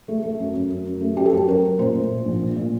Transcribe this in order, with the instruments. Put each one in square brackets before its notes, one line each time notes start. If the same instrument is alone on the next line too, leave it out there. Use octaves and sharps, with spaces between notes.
[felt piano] A3
A3
F#2
F#2
F#2
F#2
A3
F#2 G4
A4
F#3 G4
F#2 A#4
F#2
A#2 C5
A3
A#2
A#1
A#2
A#2